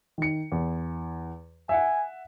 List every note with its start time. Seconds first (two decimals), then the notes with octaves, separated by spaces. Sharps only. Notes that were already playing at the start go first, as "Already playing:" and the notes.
0.18 D#3 C#7
0.52 E2
1.69 E5 F#5 G#5